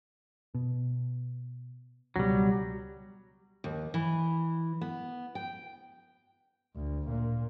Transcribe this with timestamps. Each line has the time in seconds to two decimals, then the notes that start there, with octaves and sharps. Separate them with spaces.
0.54 B2
2.16 C#2 B2 F#3 G3
3.64 D#2
3.94 E3
4.81 B3
5.35 G5
6.76 D2
7.09 A#2